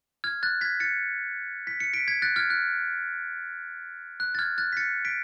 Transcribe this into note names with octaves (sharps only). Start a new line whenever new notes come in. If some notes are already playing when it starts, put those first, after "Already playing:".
F6 G#6
F#6 A6
G#6 B6
A6 C#7
B6
C#7
B6 D7
G#6 B6
F#6 A6
F6 G#6
F#6
F#6
A6
F6 G#6
F#6 A6
B6
A6 C#7
B6 D7